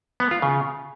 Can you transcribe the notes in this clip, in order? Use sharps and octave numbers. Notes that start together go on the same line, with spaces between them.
B3
F4
C#3